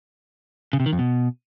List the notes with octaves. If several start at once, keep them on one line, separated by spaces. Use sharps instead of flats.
C#3
C3
D#3
F2
B2